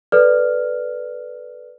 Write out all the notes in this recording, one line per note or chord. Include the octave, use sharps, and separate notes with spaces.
A4 B4 D5 F6